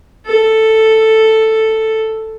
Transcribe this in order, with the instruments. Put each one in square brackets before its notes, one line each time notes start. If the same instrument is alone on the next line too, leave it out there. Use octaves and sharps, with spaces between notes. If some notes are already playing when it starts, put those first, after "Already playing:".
[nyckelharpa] A4